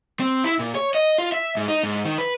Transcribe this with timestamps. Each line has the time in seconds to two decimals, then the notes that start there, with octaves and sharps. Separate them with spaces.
0.20 C4
0.44 E4
0.59 A#2
0.75 C#5
0.95 D#5
1.18 F4
1.32 E5
1.57 G#2
1.68 D#4
1.83 G#2
2.05 D#3
2.18 B4